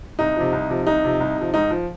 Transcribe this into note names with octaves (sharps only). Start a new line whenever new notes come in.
C2 D#4
C3 F3
C2
C3 F3
C2 D#4
C3 F3
C2
C3 F3
G#2 D#4
F3